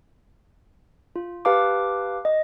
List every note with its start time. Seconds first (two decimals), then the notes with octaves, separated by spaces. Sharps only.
1.16 F4
1.45 G4 B4 F5 A5 D6
2.25 D#5